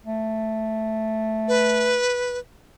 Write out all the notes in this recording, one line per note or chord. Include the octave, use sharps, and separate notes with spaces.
A3
B4